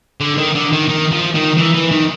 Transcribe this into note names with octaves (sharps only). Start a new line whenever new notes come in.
D3
D#3
D3
D#3
D#3
F3
D#3
E3
E3
D#3